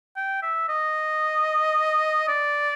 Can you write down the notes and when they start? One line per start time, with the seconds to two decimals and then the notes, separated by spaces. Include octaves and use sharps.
0.16 G5
0.43 E5
0.69 D#5
2.28 D5